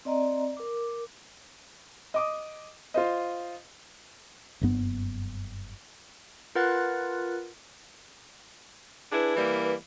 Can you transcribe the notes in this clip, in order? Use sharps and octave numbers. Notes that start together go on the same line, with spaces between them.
C4 D5 D#5 A#5
A#4 D6
D#5 D6 D#6
F4 C5 D#5
F#1 G2 B3
F4 A#4 B4 F#5 F#6 A6
D4 E4 G#4 B4
E3 G3 A#3